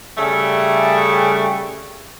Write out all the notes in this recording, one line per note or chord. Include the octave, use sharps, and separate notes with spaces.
C#3 G3 A3